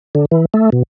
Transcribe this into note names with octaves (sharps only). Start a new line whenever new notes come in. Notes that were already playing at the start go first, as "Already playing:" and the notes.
D3
E3
A3
B2